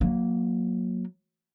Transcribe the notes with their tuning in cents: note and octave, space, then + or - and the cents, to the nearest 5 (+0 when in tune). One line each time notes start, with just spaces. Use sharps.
F#3 -20 A#3 +0